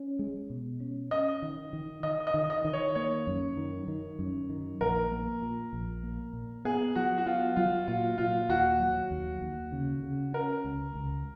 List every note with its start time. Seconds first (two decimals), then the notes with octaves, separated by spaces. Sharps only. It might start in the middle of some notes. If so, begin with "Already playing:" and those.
Already playing: C#4
0.19 G#3
0.50 B2
0.80 C#4
1.11 C#4 D#5
1.42 D#3
1.73 D#3
2.03 D#3 D#5
2.27 D#5
2.34 D#3
2.50 D#5
2.65 D#3
2.73 C#5
2.95 A#3 C#5
3.27 F#2
3.57 D#3
3.88 D#3
4.19 F#2
4.49 D#3
4.81 A#1 A#4
5.11 A#3
5.42 A#2
5.73 A#1
6.03 A#3
6.33 A#2
6.65 B3 G#4
6.95 F#3 F#4
7.18 F#4
7.26 B3 F4
7.56 F#3 F4
7.88 A#2 F4
8.18 A#2 F4
8.49 D#2 F#4
8.80 F#3
9.11 D#2
9.41 D#2
9.72 C#3
10.03 C#3
10.33 C#4 A#4
10.64 C#2
10.95 C#2